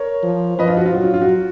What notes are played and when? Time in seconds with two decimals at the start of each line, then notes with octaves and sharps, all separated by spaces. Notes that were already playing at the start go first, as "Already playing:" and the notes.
Already playing: A#4 C#5
0.23 F3
0.59 F3 B4 D#5
0.68 F4
0.77 F#4
0.86 F4
0.95 F#3 F#4
1.03 F4
1.14 F4
1.21 F#4